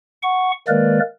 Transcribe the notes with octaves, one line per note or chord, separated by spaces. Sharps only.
F#5 C#6
D#3 G#3 A#3 A#4 B4 D5